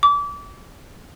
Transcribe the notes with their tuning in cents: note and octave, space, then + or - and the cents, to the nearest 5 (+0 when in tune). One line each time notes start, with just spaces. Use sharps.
D6 -30